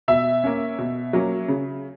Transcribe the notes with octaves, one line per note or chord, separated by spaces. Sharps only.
B2 E5
A#3 C#4
B2
F#3 A#3 C#4
C#3